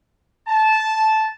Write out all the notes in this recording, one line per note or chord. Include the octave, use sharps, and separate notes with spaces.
A5